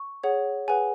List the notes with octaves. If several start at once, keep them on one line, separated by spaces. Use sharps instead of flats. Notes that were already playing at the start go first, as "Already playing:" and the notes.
Already playing: C#6
G#4 C#5 F#5
G#4 B4 F#5 G#5